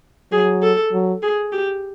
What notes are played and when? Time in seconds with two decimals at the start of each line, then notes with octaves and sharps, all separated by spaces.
0.32 F#3 G#4
0.62 A4
0.92 F#3
1.22 G#4
1.52 G4